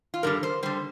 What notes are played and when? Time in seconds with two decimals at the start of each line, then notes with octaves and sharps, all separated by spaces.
0.14 F4
0.23 G2 D3 G3 A#4
0.43 C5
0.63 D3 G3 C5